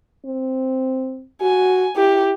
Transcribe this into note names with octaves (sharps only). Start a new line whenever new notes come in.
C4
F#4 G#5
E4 G4